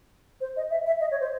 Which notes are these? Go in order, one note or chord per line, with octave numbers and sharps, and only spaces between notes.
C5
D#5
E5
E5
D#5
C#5
C5